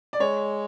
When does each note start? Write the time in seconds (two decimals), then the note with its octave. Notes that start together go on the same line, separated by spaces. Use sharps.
0.13 D5
0.20 G#3 C#5